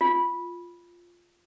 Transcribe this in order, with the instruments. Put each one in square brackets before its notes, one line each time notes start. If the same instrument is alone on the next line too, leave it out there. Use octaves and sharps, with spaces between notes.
[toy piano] F4